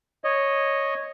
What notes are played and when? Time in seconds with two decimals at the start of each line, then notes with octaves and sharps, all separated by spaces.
0.24 C#5 D#5